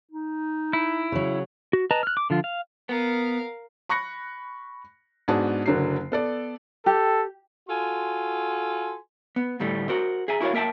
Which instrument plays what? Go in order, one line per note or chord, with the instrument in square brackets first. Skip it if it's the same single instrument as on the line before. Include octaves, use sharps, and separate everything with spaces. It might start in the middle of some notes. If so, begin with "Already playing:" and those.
[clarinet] D#4
[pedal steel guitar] E4
[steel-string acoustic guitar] C#3 F#3
[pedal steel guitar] F#4
B4 D#5 A5 A#5
F6 F#6
D6
D3 F3 F4
F5
[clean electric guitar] B3 [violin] A#4 F5
[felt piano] B5 C#6 F#6 A#6 C#7
G#2 B3 D4 F#4 G#4 A5
F#1 D3 F#3 A#4 C7
B3 A4 D5
[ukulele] G4 [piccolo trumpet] A4
[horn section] F4 F#4 A4 G#5 C6
[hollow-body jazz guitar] B3
D2 A2 G3 A3
F#4 A#4 C5
G#4 E5 G#5 A#5
E4 F#4 A#4 C#5 F5
A#3 A#4 E5 G5 A5